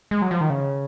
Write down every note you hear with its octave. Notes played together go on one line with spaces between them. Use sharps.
G#3
F#3
F3
D#3
C#3